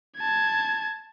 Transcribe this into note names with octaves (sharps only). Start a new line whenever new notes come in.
A5 G#6